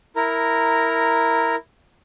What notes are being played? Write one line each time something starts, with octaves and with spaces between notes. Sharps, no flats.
E4 A#4 A#5